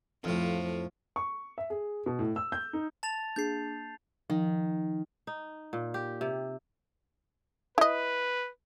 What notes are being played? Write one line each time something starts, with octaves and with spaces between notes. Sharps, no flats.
F2 A2 F3
C#6
E5
G#4
B2
A2
E6
G6
D#4
A5 A6 F7
A#3 D4 G#4 G6 C7
D#3 F3
D#4
A#2
G4
C3
E4 B4 D#5